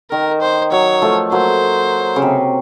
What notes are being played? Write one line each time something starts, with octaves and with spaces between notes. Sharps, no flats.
D#3 A#4
C5
F#3 C#5
F3 A3
F#3 A#3 C5
C#3
C3